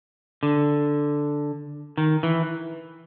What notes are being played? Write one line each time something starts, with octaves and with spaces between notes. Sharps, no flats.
D3
D#3
E3